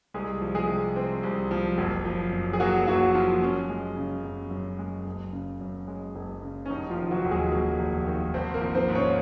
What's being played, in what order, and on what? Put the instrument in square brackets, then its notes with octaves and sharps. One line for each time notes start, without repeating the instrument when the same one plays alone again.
[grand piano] C2 G#3 G#4
F3
G#3 G#4
C3
C4
C2
F3
F#1
F3
F#2
G#4
F#3 A#3 F#4
F#1 F#3 F#4
F3 F4
F#2 C#4
G#3
C#3
F#2
F#2
G#3
F#1
C#3
F#2
G#3
F#1
C#3
C#4
F1 D#4
F3 F4
D#3
F#3 F#4
D#2
G#3 G#4
F#3 A#3 A#4
F1
D#3
G#1 C4 C5
A#3 A#4
F3
C4 C5
G#2
C#4 C#5